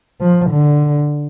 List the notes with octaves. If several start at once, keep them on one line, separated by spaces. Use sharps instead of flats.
F3
D3